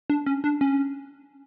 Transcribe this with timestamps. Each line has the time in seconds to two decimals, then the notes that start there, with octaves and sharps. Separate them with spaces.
0.10 D4
0.26 C#4
0.44 D4
0.61 C#4